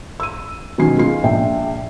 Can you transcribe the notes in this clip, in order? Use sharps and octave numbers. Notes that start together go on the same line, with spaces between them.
E6 D#7
B2 D#3 F#3 C#4 G#5 C7
G#3 F4 C7
A#1 E5 G5